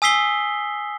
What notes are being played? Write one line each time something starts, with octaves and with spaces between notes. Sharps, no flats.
G#5 D#6 E6 B6 C7 G7